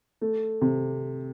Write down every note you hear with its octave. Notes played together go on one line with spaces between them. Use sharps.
A3
C3